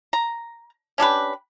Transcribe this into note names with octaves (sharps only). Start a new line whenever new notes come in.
A#5
C#4 D4 G4 B4